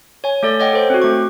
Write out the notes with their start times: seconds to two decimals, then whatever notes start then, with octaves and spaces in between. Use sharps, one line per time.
0.24 C#5 G#5
0.43 A3 A4 D5
0.60 C#5 D#5 F#5 G5
0.73 A4 C5
0.90 C4 F#4
1.02 A3 C#6